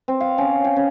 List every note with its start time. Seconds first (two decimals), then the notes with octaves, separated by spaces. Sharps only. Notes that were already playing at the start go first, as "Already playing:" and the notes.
0.08 C4
0.20 F5
0.38 C#4
0.64 G5
0.76 C#4